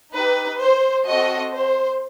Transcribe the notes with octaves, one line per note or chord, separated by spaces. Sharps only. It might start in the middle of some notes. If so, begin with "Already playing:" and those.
D#4 G4 B4
C5
C4 F#4 A4 D#5
C5